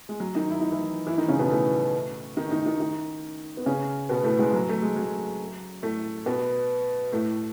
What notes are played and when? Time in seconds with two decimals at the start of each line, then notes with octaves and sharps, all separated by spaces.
0.09 G#3
0.20 F#3
0.35 D#3 D#4
0.50 E4
0.61 D#4
0.72 E3 E4
1.07 E3 E4
1.17 D#3 D#4
1.28 C#3 C#4
1.39 B2 B3
1.50 A2 A3
2.37 D#3 D#4
2.51 D#3 D#4
2.66 D#3 D#4
2.80 D#3 D#4
3.57 B3
3.66 C#3 C#4
4.09 B2 B3
4.24 A2 A3
4.39 G#2 G#3
4.53 F#3
4.69 A3
4.82 G#3
4.96 F#3
5.82 A2 A3
6.26 B2 B3
7.12 A2 A3